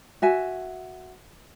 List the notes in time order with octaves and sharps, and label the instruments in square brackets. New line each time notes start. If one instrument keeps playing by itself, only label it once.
[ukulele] F#4 E5 G#5